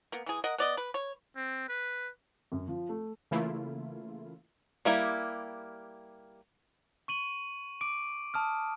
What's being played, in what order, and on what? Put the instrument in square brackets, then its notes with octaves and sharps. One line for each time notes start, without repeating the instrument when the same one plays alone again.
[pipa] A#3 B3
E3 G#4
A#4 D#5 F#5
B3 D5 D#5
B4
C#5
[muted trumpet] C4
B4
[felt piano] F#2
F3
A3
[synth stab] C#3 E3 A3 A#3 E4 F4
[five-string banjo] G3 A#3 E4 G4
[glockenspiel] C#6 D#7 F#7
D6 D7
A5 D#6 F6